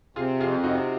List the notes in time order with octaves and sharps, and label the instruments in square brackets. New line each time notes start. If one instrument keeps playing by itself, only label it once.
[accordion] C3 [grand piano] F4 G#4
[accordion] F2 [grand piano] F4 G#4
[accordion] C3 [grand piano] D#4 F#4